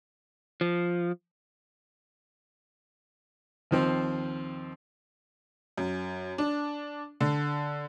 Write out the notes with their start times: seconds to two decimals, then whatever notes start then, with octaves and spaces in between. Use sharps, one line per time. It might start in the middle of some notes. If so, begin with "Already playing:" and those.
0.61 F3
3.71 D#2 F3 C4
5.78 F#2
6.38 D4
7.21 D3